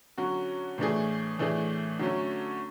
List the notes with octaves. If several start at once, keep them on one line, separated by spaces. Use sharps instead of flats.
D3 F#3 C#4 F#4
A2 E3 A3 D4 G#4
A2 E3 A3 D4 G#4
D3 F#3 A3 C#4